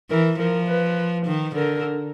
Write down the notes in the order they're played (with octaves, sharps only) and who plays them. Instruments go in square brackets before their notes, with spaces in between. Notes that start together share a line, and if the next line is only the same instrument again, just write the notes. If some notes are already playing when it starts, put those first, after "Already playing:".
[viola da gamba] E3 [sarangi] A#4
[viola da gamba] F3 [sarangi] A#4
[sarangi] B4
[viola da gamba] D#3
[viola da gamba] D3 [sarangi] A#4